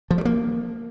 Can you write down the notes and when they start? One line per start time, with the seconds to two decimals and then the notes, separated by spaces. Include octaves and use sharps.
0.11 F3
0.18 G3
0.25 A#3